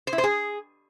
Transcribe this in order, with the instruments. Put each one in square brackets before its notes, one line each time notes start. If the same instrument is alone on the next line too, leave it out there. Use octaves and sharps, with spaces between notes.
[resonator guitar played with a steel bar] C5
E4
C5
G#4